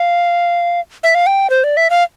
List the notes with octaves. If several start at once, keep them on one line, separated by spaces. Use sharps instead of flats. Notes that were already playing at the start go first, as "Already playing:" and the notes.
Already playing: F5
E5
F5
G5
C5
D5
E5
F5